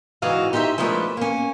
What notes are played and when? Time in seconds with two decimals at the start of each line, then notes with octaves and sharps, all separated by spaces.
0.22 G#2 D3 E3 F#4 D#5 F5
0.53 D#4 G4 C5 D5 E5
0.78 F3 G#3 A3 D4 A#4 B4
1.17 A#3 C#4